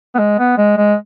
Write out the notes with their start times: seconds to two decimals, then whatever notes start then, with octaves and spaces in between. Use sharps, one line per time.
0.15 B3
0.18 G#3
0.39 B3
0.58 G#3
0.77 G#3